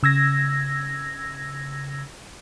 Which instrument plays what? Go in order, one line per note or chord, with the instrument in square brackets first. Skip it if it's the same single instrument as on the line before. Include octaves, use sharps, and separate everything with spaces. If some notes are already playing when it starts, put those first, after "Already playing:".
[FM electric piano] C#3 E6 G#6 A#6